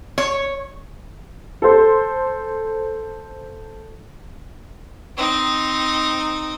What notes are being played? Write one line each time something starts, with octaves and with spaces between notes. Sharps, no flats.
C#5
A4 C5
C4 D#4